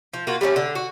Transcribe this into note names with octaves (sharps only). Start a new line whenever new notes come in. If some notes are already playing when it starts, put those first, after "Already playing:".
F3
A#3 F4 F#4
G3 A3 B3 C#4
D3
F#4